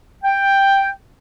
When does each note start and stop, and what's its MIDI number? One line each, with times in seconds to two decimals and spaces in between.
0.24 0.89 79